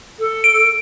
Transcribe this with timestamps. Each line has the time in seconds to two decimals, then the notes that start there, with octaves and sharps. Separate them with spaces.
0.19 A4
0.44 D7